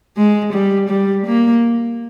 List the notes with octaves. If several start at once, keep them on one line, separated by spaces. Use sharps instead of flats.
G#3
G3
G3
A#3